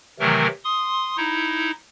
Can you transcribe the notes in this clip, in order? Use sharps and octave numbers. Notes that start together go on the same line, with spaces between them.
C3 D#3 E3 F#3 A3 A#4
C6 D#6
D#4 E4